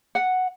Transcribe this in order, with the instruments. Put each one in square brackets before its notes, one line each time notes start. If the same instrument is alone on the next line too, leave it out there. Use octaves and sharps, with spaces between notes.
[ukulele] F#5